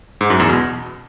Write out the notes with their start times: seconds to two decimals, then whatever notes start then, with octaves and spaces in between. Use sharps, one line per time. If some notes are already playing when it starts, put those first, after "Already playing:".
0.21 G#2
0.30 F#2
0.40 E2
0.49 B2